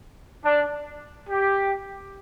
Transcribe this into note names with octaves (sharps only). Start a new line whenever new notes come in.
D4
G4